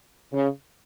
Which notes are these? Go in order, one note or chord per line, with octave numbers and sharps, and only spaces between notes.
C#3